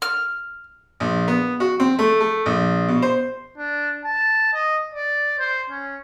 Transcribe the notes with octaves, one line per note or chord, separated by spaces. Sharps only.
F6
A#1
B3
F#4
C4
A3
A3
A#1
B2
C5
D4
A5
D#5
D5
C5
C#4